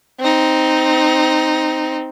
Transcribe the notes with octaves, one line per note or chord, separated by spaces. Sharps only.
C4 D#4